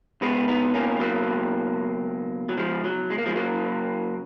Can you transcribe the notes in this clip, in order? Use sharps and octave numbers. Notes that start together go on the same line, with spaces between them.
C#2 B2 G#3 B3
B3 D#4
A#3 C#4
F#3 A#3
F#3
F3 G#3
F#3
G#3
A#3
F3 G#3
F#2 C#3 F#3 A#3